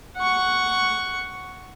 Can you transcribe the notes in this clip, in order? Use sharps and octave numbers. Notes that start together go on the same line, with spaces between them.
F#5 C#6